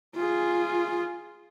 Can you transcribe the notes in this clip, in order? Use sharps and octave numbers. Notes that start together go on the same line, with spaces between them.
F4 G#4